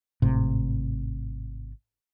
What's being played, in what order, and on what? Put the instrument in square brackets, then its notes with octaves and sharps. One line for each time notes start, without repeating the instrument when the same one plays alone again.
[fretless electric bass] G#1 A2 C3